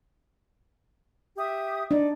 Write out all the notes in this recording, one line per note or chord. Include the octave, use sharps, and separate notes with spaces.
G4 E5 D#6
D4 D#4 D5